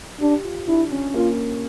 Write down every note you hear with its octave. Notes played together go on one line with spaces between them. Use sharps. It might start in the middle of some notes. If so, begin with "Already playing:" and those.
D4 G4
F4
D4 E4
C#4
A#3 F4